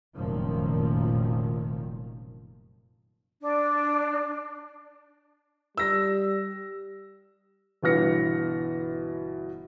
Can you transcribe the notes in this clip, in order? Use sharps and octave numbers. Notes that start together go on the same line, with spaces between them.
F1 F#2 A#2 D#3 F3
D4
G3 E6 A#6
G1 B2 E3 F6 A#6 C#7